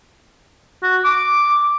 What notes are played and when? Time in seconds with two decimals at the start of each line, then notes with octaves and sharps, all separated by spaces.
0.83 F#4
1.04 D6